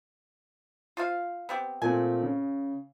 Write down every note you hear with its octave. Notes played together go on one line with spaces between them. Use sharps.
F4 C5 F5
B3 C4 G4
A#2 A3 C4 G#5
C#3